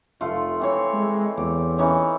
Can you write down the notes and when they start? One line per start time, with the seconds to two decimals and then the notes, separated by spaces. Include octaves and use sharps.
0.21 F1 A3 F4
0.60 E3 C4 C#5
0.93 G#3
1.38 E2 D6
1.78 E3 C#4 D#4